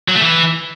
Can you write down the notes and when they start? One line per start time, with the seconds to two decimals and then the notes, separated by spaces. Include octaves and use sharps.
0.08 F#3
0.15 A3
0.22 E3